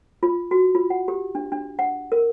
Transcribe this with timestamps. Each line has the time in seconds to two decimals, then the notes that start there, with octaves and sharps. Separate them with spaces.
0.23 F4
0.51 F#4
0.75 F4
0.90 F#5
1.08 G4
1.35 D4
1.52 D4
1.79 F#5
2.12 A#4